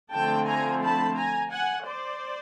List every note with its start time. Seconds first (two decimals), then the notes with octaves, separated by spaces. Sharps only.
0.12 D3 F3 A3 C4 G5 A5
0.47 G#5 A#5
0.82 A5 B5
1.16 G#5 A#5
1.51 F#5 G#5
1.86 C5 D5